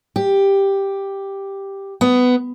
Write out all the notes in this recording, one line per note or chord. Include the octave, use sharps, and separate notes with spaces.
G4
B3